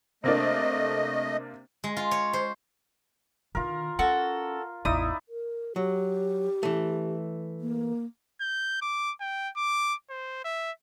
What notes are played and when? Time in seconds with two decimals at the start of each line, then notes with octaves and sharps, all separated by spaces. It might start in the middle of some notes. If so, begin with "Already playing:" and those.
0.24 C3 A3 A#3 D4 D#5
1.84 G#3
1.97 F4
2.11 C#5
2.33 C5
3.55 D3 D#3 F4 A#4
3.99 C#4 F#4 A4
4.85 A1 E2 D#4 E4 D5 D#6
5.28 A#4
5.76 F#3 G4
6.63 E3 A3
7.61 A#3
8.41 G6
8.82 D6
9.21 G5
9.57 D6
10.10 C5
10.45 E5